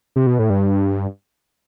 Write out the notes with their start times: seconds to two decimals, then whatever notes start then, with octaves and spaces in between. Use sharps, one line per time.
0.16 C3
0.27 B2
0.39 A2
0.50 G2